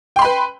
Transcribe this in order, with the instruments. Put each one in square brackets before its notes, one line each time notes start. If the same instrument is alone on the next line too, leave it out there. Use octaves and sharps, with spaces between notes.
[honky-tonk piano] G5
C6
B5
B4